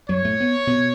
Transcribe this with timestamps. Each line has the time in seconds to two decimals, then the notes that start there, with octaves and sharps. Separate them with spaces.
0.09 F#2 F#3 C#5
0.25 A2 A3
0.40 B3
0.67 B2 B3